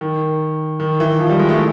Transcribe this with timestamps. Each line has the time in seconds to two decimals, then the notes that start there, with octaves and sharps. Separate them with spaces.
0.01 D#3
0.80 D#3
1.00 E3
1.20 F3
1.29 G3
1.39 G#3
1.49 A3